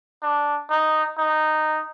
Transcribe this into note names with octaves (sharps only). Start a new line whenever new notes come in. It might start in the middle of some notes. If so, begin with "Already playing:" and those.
D4
D#4
D#4